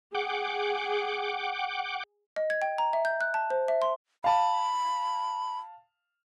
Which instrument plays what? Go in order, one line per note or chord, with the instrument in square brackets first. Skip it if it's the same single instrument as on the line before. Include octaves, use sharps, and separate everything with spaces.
[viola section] G#4 [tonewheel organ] F#5 G5 D6
[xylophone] D#5
G#6
G5
A#5
E5
G6
F#6
A5
C5
E5
C6
[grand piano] F5 A5 [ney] B5